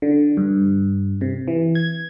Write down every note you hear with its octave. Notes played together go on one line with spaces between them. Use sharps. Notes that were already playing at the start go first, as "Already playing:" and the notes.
D3
G2
C3
E3
G#6